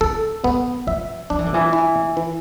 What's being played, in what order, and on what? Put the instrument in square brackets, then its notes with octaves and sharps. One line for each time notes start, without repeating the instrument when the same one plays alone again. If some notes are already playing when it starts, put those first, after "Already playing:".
[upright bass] D3 [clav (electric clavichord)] A4
[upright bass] E3 [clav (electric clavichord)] B3
[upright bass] F3 [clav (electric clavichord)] E5
[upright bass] F3 [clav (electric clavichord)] D4
[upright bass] E3
D3
E3
[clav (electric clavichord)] E4
E3